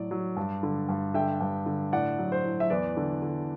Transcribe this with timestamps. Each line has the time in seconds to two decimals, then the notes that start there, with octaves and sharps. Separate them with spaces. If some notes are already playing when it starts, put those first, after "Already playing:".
Already playing: A2 F#3 D5
0.11 F#3
0.37 G2
0.63 D3
0.89 G2
1.14 D3 E5 G5
1.41 G2
1.66 D3
1.92 A2 D5 F#5
2.18 F#3
2.32 C5
2.45 A2
2.60 E5
2.70 E2 B4 D5
2.97 D3
3.22 D3